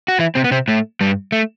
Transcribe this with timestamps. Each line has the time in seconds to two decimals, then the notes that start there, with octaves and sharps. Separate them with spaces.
0.08 F#4
0.19 E3 E4
0.35 C3 C4
0.44 B3
0.51 C3 C4
0.68 A2 A3
1.01 G2 G3
1.32 A3